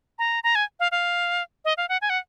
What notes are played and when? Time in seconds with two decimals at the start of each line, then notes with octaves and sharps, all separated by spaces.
0.19 A#5
0.44 A#5
0.55 G#5
0.80 F5
0.92 F5
1.65 D#5
1.77 F5
1.89 F#5
2.01 G#5
2.10 F#5